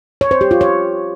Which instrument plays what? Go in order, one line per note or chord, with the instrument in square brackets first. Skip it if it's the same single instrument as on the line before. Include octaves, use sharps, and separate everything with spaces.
[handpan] C#5
C5
G4
F4
C#5